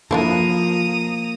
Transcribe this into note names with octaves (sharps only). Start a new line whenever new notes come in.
F3 A#3 D4 E4 A4 A#5 D#6